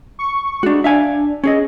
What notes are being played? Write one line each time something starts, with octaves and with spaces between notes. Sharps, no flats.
C#6
G#3 D4 F#4
D4 E5 F5 G#5
C#4 G#4 D#5